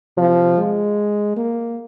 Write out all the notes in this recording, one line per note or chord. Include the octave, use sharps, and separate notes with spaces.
C3 F3
G#3
A#3